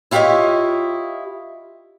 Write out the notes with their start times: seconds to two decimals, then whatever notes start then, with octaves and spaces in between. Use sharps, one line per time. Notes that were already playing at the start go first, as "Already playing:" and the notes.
0.11 E4 F4 G4 A#4 C#5 D#5